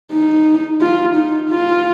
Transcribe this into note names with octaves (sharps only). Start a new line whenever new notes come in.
D#4
F4
D#4
F4